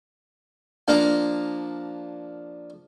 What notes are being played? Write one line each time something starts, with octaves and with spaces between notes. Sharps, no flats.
F3 A#3 D4 A#4